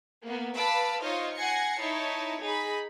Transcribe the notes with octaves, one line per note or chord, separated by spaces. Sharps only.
A#3 B3
B4 F5 A5 B5 D6 E6
D#4 F4 C5 C#5 D#5 F5
F#5 G#5 G#6 A#6 C7 C#7
D#4 E4 C#5 A5
D#4 G#4 B5